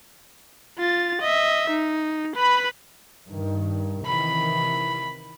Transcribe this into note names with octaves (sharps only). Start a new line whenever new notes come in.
F4 A6
D#5 E5
D#4
B4 B5
G2 D#3
C3 D#3 E3 B5